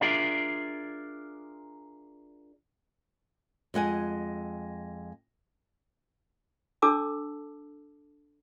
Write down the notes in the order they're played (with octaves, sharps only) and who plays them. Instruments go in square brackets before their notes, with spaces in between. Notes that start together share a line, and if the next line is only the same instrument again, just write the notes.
[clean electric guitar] D4 F4 G#4 A#4 D5 E5
[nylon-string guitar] F2 G#3 F#5 G#5
[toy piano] D4 A4 A5 D6 E6